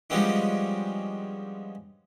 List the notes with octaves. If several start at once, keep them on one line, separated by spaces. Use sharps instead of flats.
F3 G3 G#3 B3 C#4 D4